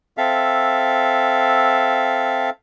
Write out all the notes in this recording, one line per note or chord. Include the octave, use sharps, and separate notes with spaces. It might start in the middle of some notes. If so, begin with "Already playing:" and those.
C4 A4 E5 F5